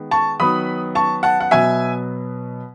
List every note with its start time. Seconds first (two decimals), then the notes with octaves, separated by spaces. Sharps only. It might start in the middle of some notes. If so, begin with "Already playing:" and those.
Already playing: D#3 G#3 B3
0.11 A5 C#6
0.40 D#3 F#3 B3 B5 D#6
0.95 A5 C#6
1.23 F#5 A5
1.40 F#5
1.51 B2 F#3 B3 E5 G#5